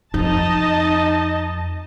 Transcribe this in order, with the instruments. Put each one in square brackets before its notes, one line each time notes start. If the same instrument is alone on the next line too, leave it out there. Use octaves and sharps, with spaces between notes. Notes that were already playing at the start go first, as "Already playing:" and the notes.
[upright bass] F2 [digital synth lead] D#4 [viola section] D#5 A5